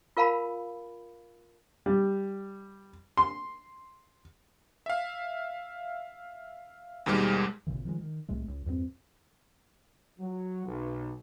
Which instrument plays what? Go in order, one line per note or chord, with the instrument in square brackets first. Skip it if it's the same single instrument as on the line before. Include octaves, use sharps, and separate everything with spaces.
[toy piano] F4 A#4 F5 A5 B5
[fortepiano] G3
C6
[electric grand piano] E5 F5
D#2 G#2 B2 G3 G#3 F6
[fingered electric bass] G#1 A#2 C#3 E3
D#3 F3 F#3 G#3
D#3
C2 A2 G#3 A3
C#2
E2 G2 A#3 C4
[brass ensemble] F#3
B1